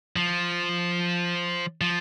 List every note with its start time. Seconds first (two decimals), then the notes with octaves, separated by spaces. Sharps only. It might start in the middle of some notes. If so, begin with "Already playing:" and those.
0.16 F3
1.81 F3